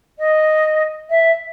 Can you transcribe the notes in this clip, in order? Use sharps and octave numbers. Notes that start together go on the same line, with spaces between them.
D#5
E5